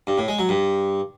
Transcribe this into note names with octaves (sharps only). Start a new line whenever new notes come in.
G2
A2
G#3
F#3
G2